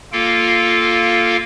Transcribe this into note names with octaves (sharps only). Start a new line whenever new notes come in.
A#3 F4 A4 F5 G5